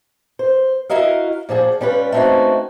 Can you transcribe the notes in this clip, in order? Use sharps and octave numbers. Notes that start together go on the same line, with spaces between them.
C5
E4 F#4 A#4 D#5 F5
A#2 F3 F#4 G#4
G3 C#4 F4 B4
A3 A#3 C4 C#4 D#4 F#4